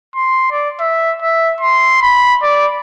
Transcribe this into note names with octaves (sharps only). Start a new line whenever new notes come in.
C6
D5
E5
E5
C6
B5
D5